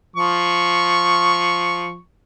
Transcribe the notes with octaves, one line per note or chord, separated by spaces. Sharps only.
F3 C#6